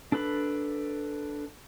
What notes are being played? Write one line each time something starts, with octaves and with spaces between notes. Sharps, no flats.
D4 A4 B4 B5